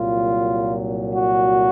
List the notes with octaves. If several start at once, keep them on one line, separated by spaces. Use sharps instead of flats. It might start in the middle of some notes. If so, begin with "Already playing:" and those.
Already playing: C2 A#2 F#3 F4
F#4